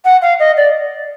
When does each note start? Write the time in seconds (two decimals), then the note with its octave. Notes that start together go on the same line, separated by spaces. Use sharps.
0.04 F#5
0.21 F5
0.39 D#5
0.56 D5